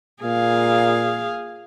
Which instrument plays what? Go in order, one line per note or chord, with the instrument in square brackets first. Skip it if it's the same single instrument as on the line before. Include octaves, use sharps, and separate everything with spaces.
[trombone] A#2 [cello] G#4 F5